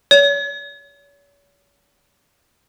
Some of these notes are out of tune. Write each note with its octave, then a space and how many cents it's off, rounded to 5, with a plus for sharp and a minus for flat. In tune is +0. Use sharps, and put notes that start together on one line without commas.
C#5 +40